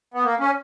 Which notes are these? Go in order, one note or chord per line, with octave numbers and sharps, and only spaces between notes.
B3
A#3
C#4